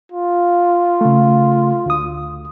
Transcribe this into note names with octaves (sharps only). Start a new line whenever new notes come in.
F4
C#3 A3
D2 D#6